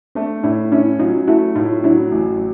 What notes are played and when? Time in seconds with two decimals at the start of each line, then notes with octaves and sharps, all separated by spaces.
0.15 A3 C4 D4
0.44 A2 D4 E4
0.72 C#4 D4 E4
0.99 F#3 D#4 F4
1.28 A3 E4 F#4
1.55 A2 D#4 F4
1.84 F#3 D4 E4
2.12 A1